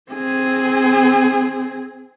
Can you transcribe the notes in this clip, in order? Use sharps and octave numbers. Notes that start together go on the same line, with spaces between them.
C4 G#4